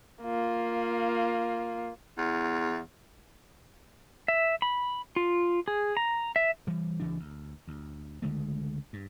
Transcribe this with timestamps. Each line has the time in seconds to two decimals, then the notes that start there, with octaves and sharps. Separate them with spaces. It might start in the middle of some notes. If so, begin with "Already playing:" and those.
0.23 A#3 F4
2.18 E2
4.28 E5
4.62 B5
5.16 F4
5.68 G#4
5.97 A#5
6.36 E5
6.67 E3 G3
7.00 C#2 E3 D4
7.19 D2
7.68 D2
8.22 C#2 D3 G#3 A3
8.93 G2